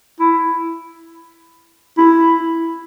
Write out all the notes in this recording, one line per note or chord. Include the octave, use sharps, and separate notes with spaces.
E4
E4